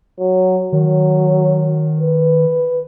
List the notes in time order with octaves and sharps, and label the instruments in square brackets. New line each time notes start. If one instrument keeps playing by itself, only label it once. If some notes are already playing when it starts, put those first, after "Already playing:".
[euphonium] F#3
[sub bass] D#3 [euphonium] F#3
[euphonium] B4